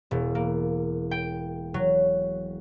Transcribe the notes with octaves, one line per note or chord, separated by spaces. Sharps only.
E1
A#3
G5
F#3